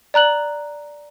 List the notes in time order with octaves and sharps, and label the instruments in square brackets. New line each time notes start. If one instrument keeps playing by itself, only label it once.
[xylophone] D5 A#5 F#6 F#7